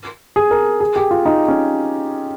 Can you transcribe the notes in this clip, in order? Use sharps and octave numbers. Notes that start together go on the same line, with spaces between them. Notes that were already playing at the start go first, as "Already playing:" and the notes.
G#4
A#4
G#4
G4
F4
D#4
C#4